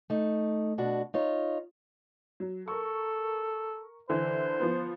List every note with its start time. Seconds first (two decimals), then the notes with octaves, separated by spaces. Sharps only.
0.10 A3 D#4
0.78 B2 D4 F#4
1.14 D#4 F4 C#5
2.40 F#3
2.68 A4 A#4 C#6
4.09 D3 E3 E4 C5
4.60 F3 B3